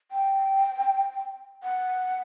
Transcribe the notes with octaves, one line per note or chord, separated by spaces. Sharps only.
G5
F#5